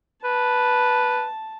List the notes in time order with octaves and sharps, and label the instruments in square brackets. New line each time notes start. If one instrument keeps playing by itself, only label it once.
[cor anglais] B4 [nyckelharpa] A5